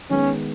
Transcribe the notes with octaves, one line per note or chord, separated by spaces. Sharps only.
D#3 G#3 B3 C#4